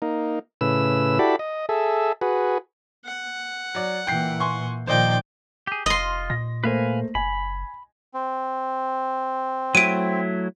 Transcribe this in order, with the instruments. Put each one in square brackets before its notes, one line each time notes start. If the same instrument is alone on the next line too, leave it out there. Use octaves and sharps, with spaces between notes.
[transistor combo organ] A#3 D#4
A2 C#3 B4 E6
E4 F#4 G4 A4 D5 B5
D#5
G#4 A4 E5
F#4 G#4 B4
[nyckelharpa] F#5
[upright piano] F#3 D5
[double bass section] A#2 E3 [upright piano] G5 G6 C7
[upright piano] G#5 C6 C#6
[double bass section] A#2 D#3 F3 [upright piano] C5 D#5 [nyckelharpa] D5 G5
[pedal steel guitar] G4 G#4
[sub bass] F1 [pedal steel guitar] F4 [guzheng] D#5 C6
[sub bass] A#2 [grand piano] A#6
[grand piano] A3 A#3 C5 [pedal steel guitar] B4 F5 G#5
[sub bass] F#1 [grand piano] G#5 [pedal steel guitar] B5
[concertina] C4
[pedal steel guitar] F#3 A3 E4 [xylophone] D7 D#7